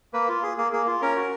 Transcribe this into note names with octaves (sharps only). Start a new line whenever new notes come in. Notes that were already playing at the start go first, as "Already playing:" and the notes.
A#3 B4
F4
G#4
A#3 G#4
A#3 G#4
F4
C#4 A#4
F#4